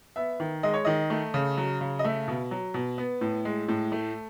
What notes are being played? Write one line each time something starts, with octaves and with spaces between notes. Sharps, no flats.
B3 E5
D#3
G#3 D#5
C#5
D#3 D#5
A3
C#3
F#3
C#3
D#5
A3 E5
B2
F#3
B2
B3
A2
G#3
A2
A3